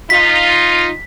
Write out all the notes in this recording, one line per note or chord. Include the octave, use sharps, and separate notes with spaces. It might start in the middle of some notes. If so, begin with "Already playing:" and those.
D#4 F4 B6